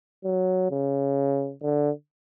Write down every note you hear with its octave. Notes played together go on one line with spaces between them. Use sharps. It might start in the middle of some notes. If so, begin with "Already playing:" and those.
F#3
C#3
D3